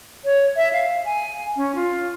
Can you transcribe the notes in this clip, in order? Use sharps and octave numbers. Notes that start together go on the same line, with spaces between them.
C#5
E5
F5
G#5
C#4
F4